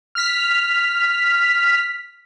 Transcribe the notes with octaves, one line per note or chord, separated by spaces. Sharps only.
F6 B6